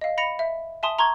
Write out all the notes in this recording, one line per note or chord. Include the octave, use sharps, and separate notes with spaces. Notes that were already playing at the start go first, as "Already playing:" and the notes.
D#5 F5
B5 A#6 C#7 F7
E5
E5 G#5 A5 C6 D#6
A#5 C6 C#6 G#6